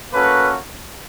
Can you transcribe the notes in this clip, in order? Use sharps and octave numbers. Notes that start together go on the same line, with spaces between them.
A#3 C#4 F#4 A4 B4